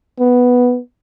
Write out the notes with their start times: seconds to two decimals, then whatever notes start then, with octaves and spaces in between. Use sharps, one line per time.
0.20 B3